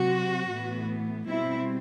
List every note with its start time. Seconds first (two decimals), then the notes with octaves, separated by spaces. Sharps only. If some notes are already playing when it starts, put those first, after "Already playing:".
Already playing: C3 F#3 C4 F#4
0.50 A2 E3 B3
1.27 B2 G3 C4 E4